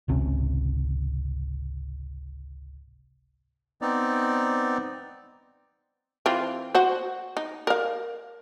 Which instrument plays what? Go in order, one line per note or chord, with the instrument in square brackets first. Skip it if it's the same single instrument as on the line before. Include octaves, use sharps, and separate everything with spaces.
[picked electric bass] G#1 C#2 C3 C#4
[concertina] B3 C4 D#4 D5
[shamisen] E3 C4 F4
F#4 C5
D#4
A#4 F5